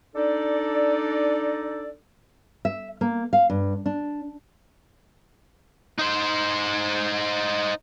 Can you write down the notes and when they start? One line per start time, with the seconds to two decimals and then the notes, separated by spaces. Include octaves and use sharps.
0.16 D4 D#4 A4 D5
2.65 E5
3.01 A#3
3.33 F5
3.50 G2
3.86 D4
5.98 D#4 C5